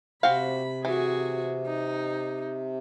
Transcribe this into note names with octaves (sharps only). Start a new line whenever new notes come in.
C3 C4 F#4 F5 B5
E3 F#4 G#4
D#4